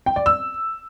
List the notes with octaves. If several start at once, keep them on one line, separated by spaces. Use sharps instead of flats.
G5
D5
E6